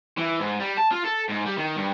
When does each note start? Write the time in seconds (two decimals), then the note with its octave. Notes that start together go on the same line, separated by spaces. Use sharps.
0.18 E3
0.40 G#2
0.60 G3
0.77 A5
0.91 F4
1.05 A4
1.29 G#2
1.46 G3
1.57 D#3
1.76 G2